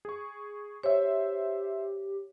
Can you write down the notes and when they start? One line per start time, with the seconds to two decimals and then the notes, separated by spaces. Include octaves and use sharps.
0.05 G#4 C#6
0.83 G4 C5 C#5 E5